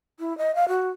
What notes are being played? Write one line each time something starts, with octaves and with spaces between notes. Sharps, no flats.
E4
D#5
F5
F#4